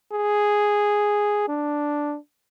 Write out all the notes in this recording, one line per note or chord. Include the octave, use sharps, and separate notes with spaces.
G#4
D4